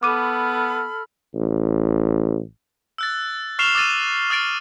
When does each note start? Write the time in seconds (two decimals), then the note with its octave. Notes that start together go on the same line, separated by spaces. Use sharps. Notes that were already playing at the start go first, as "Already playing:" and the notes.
0.03 B3 A4 B5 D6 F6 D#7
1.35 A1
2.98 E6 F#6 A6
3.59 C#6 F6 C7 E7 F7 G7
3.75 D6 E6 A6 D#7
4.30 D#6 F6 A6 D7